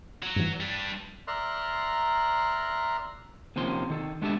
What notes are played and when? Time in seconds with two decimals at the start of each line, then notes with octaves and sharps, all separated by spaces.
0.23 F#3
0.36 G2 E3
0.60 G3 D4
1.27 A#4 D5 E5 A#5 C6 F#6
3.56 D#2 C3 F3 C#4 C6
3.90 D#3 A4
4.22 G#3 B3 D4 G4 A4 E5